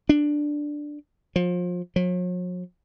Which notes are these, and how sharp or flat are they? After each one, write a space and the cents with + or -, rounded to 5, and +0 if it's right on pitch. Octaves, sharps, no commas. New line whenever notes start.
D4 +5
F3 +30
F#3 -45